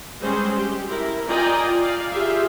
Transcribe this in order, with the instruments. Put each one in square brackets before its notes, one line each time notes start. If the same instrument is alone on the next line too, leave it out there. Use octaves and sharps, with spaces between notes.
[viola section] G3 G#3 C4 C#4 G#4 C5
G4
E4 A#4
F4 D5 D#5 G5 G#5 A#5
D5 F5
F4 G4 G#4 E5 F5